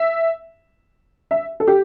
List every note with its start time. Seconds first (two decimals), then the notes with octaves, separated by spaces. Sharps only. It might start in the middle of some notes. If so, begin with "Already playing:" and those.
Already playing: E5
1.31 E5
1.60 A4
1.67 G4